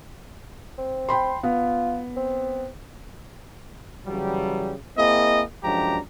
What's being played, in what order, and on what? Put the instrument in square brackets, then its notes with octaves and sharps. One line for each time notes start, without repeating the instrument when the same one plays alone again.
[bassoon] C4
[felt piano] G5 B5 C6
[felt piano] B3 [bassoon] F4
[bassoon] C4
[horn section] C#3 E3 F#3 G3
A#3 C4 E4 G#4 D#5
F#2 F3 G#3 D4 G4 A#5